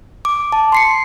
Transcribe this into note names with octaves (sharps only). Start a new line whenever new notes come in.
D6
A5
C6 C7 C#7